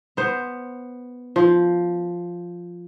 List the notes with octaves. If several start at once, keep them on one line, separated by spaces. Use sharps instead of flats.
B3 C5
F3